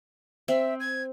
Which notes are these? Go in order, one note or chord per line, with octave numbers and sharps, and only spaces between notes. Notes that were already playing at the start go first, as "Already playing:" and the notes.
C4 E5
G#6